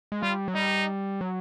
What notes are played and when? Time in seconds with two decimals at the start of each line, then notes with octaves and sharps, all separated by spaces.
0.12 G#3
0.22 G3 F4
0.48 F#3
0.55 G3 D#4
1.21 F#3